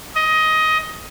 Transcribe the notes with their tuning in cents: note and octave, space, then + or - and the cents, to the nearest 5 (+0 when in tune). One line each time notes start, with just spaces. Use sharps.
D#5 +15